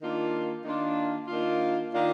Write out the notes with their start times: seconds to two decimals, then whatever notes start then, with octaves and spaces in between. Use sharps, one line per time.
0.01 D#3 A#3 D4 F4
0.64 D#3 A#3 D4 F4
1.28 D#3 A#3 D4 F4
1.92 D#3 A#3 D4 F4